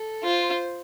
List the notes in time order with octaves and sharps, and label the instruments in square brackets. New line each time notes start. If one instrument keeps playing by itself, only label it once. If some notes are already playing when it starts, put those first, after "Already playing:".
Already playing: [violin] A4
[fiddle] F4 [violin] C5